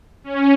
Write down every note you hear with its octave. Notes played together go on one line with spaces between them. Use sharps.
C#4